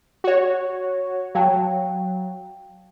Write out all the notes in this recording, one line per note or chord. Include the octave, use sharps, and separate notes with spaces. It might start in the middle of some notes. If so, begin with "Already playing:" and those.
F#4 C#5
F#3 F5 G5 A5